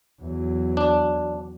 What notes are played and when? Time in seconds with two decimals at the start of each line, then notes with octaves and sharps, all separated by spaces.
0.21 E2 F#3
0.77 D4